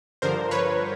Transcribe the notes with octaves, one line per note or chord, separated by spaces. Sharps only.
G2 D3 F3 A#4 C5
B4 C#5